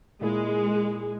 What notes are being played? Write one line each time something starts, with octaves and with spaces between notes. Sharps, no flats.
A#2 G#3 A#3 E4 G#4